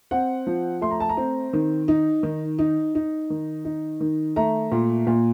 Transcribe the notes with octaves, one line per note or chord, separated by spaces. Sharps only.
C4 F#5
F3
A3 C6
A#5
A5
A#5
C4
D#3
D#4
D#3
D#4
D#4
D#3
D#4
D#3
A3 A#5
A#2
A#2